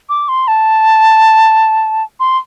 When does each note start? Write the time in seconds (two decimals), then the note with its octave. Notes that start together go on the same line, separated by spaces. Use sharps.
0.09 D6
0.29 C6
0.48 A5
2.20 C6